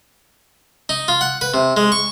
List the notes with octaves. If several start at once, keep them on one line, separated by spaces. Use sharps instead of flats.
D#4
F4
F#5
B4
C3
G#3
C#6